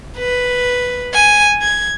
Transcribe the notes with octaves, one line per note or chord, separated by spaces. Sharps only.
B4
G#5
G#6